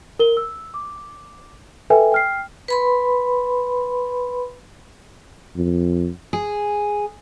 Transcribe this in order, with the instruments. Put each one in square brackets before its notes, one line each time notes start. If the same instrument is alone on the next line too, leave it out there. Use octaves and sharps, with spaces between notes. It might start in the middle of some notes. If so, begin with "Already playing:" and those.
[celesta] A#4 G7
E6
D6
A4 B4 E5 G5 G#5
G5 F6 C7
[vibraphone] B4 B5 C6
[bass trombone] F2
[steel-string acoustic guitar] G#4